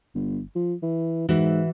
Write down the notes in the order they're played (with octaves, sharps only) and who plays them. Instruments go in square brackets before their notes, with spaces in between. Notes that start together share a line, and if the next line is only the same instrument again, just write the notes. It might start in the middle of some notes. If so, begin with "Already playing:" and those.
[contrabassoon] G1
F3
E3
[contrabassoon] G#2 [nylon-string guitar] E3 F#4 E5